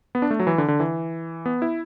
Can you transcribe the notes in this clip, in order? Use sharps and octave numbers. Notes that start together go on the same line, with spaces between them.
B3
D4
A3
F#3
E3
D3
D3
E3
B3
E4